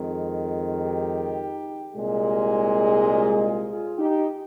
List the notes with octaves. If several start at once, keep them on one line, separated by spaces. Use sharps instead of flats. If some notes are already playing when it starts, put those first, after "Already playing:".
Already playing: F2 D#3 G#3
D#4 G4
C2 A#2 G#3
F4 G#4
F4 G#4
D#4 G4